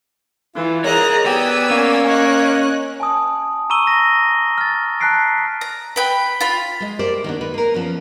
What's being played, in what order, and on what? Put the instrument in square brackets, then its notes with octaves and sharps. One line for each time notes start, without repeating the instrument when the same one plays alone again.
[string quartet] E3 [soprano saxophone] F4
[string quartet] G#4 A#5 F#6 [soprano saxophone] A#4 [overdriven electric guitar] C#5 D#5
[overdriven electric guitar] B3 [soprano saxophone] G4 [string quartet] D5 G#5 E6
[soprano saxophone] A#3 [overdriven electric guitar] C#4
[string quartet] C#5 D#5 F#6
[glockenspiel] G#5 A5 D#6
A#5 C#6 E6 D#7 G7
A#6
F6 A6
A5 A#5 F#6 B6 C7 D7
[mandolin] A#5
B4 G5 B5
F4 B5
[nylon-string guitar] G#3 D#5
G4 A#4 C5 D5
D#3 A#3 B3 D4
D#3 B4
A#3 A#4
F3 B3 C#4